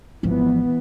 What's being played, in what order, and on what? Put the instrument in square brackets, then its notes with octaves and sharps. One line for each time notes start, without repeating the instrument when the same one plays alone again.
[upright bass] G#1 F3 [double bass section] E3 B3